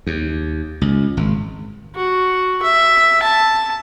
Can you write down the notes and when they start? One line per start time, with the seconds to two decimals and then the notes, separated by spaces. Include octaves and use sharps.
0.07 D#2
0.81 C#2
1.17 G#1
1.95 F#4
2.62 E5
3.23 A5